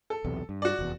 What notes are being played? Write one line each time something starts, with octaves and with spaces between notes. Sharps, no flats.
A4
B1 E2 C3
G2
F#4 D5
F1 E2